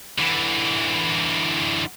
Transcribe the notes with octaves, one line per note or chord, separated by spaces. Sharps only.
D3 E3